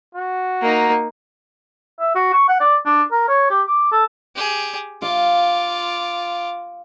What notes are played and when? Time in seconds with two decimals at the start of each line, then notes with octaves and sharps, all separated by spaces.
0.15 F#4
0.62 A#3 D#4
2.00 E5
2.15 F#4
2.33 C#6
2.49 F#5
2.60 D5
2.86 D4
3.12 A#4
3.29 C#5
3.50 G4
3.67 D6
3.92 A4
4.36 G4 G#4
5.02 F4 F5 D6